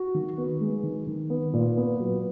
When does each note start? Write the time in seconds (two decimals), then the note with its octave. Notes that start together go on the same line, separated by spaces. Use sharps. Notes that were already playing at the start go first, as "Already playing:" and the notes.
Already playing: F#4
0.14 D#3
0.38 B3
0.61 G#3
0.83 D#3
1.07 D#3
1.30 B3
1.53 A#2
1.77 B3
2.00 F#3